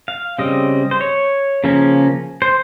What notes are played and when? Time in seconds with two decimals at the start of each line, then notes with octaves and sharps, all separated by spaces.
0.08 F5
0.38 C#3 G3 C4 D#5
0.91 C5
1.01 C#5
1.64 C#3 F3 A#3 C#4
2.42 C5